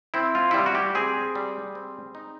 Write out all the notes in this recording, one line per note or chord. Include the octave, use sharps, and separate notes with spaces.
C4 E4
F4
E4
G3 F4
F#4
G4
C4 G#4
G3
C4
D#4